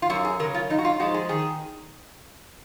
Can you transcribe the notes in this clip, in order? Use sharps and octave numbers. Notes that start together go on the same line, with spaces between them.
F4
F#2 F#4
G#4
C#3 F#3 A#4
F4
F#2 D#4
F#4
F4
F3 G#3 D#4 F#4
G#4
D#3 G#4